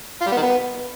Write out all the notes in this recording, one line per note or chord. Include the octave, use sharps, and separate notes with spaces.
F4
G3
B3
D#3
B3